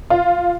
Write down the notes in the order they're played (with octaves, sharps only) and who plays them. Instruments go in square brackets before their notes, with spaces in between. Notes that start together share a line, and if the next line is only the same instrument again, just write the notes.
[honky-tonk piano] F4